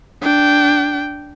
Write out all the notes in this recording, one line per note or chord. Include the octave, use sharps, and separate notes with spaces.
D4 G5